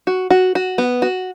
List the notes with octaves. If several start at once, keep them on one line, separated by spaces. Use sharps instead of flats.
F#4
F#4
F#4
B3
F#4